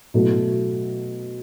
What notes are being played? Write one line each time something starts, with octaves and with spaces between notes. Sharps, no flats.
B2 F#3 A3 E4